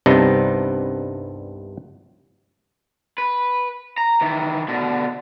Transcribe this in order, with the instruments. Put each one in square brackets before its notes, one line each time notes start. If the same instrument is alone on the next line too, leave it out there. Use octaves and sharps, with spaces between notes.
[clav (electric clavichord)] C2 G2 C3 B3 D4 D#4
[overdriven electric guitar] B4
A#5
D#3 E3
B2 D3